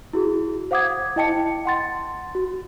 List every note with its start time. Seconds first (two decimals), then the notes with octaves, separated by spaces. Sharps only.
0.13 E4 F#4 G#4
0.71 C5 F5 F#5 D6 D#6 G#6
1.16 E4 D#5 G5 A5 C#7
1.66 F#5 C6 A6
2.35 F#4